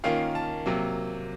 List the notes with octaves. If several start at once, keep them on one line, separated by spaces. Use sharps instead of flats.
D#3 A#3 C#4 F4 F5
A5
C3 F#3 A#3